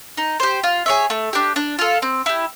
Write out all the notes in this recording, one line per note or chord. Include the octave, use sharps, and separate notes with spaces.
D#4
G4 C5
F4
G#4 C#5 E5
A3
D4 G4
D4
F4 A4
C4
E4 G4